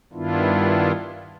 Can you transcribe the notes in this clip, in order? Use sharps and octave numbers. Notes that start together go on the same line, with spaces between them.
G2 D#3 B3 D4 E4 F4